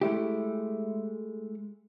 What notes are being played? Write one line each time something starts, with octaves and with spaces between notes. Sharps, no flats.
G#3 A3 E4 G4